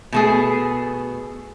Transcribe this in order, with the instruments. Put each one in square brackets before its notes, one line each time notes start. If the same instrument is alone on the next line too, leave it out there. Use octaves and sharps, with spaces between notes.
[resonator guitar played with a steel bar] B2 A3 G#4